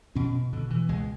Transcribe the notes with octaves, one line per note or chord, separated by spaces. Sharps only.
B2 C#4
B2 D3
E3
C#2 G#3